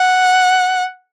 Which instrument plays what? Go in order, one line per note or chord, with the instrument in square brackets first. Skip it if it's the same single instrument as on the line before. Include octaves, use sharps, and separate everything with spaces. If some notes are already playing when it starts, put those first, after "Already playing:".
Already playing: [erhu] F#5